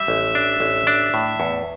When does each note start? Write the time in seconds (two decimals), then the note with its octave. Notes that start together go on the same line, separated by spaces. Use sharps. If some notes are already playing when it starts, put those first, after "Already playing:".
Already playing: G3 E5
0.08 A1
0.35 D4
0.60 A1
0.87 D4
1.14 A2
1.40 E2